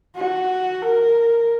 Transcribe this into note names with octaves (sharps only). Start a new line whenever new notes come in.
F#4
A#4